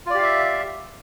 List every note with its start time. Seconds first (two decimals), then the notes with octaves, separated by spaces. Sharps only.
0.06 F4
0.10 D5
0.14 G4
0.18 F5
0.22 E5